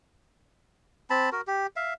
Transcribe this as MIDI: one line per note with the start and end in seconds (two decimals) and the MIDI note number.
1.10 1.30 60
1.10 1.30 81
1.10 1.30 83
1.32 1.41 66
1.32 1.41 70
1.47 1.67 67
1.76 1.94 76
1.76 1.94 77